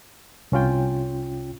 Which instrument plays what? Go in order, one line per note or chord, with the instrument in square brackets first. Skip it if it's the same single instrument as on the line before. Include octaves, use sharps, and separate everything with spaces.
[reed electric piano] C2 C#4 F4 G5